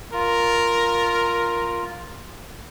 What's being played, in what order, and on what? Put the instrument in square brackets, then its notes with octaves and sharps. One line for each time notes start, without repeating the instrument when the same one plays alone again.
[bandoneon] F4 [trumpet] A#4